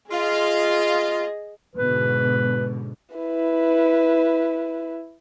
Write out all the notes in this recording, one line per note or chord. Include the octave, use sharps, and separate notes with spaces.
F4 G#4 D#5
G#2 B2 D3 B4
E4 B4